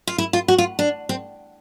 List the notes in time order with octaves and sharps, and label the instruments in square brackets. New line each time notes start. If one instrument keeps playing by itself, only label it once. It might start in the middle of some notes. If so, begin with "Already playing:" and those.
[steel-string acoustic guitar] F4
E4
F4
F#4
F4
D4
C4